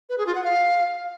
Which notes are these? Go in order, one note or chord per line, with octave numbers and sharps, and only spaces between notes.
B4
G#4
F4
F#5
F5